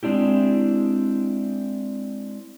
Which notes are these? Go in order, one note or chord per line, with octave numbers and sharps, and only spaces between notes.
G#3 C4 D4 E4 G4